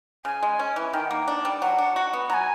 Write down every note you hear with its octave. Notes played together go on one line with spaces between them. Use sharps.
C#3 G#5
G#3
C#4
E3
D#3 G5
A#3 F#5
G5
D4
G3
F#3 F#5
D4
F#4
B3
F#3 G#5 A#5